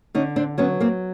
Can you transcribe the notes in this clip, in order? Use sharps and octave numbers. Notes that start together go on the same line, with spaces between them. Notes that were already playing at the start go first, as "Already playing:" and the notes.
D3 C#4 D#4
C4 D4
F#3 B3 C#4
A#3 C4